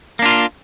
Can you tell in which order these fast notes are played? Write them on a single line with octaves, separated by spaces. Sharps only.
A#3 D4 F4